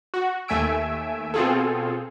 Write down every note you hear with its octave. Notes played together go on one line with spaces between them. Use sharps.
F#4
D#2 A3 E5 G#5 E6 D7
B2 C4 F4 G#4 A4